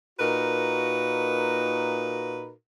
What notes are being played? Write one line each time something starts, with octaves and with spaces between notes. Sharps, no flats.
A#2 D#4 F#4 A#4 B4